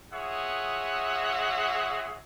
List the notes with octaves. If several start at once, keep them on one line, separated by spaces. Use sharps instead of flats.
F4 G#4 C#5 D#5 E5 F#5